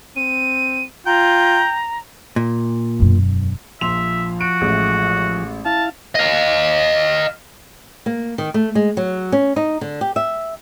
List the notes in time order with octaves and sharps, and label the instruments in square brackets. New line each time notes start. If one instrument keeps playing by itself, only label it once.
[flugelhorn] C4 [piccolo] D#7
[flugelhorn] F4 [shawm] G5 [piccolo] A#5
[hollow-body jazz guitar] A#2
[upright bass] E1 F#2
[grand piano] A#1 C6 F7 [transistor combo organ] F3 [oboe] E5
[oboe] F#4 [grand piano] D7
[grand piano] A1 G#3 A3
[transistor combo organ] E4 F5 [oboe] A5
[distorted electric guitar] D#5 F5
[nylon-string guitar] A#3
D#3
A3
G#3
F#3
C#4
D#4
D3
G4
E5